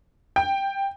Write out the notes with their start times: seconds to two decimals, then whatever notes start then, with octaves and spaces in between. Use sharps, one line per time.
0.36 G5